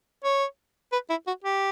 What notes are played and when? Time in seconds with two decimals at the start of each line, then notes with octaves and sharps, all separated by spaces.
0.24 C#5
0.92 B4
1.10 E4
1.27 F#4
1.44 G4